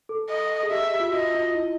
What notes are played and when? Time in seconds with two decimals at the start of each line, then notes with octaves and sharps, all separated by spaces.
0.09 A4
0.30 D#5
0.63 G#4
0.71 G4 E5
1.00 F4
1.09 F#4
1.13 F4 D#5
1.35 F4
1.55 E4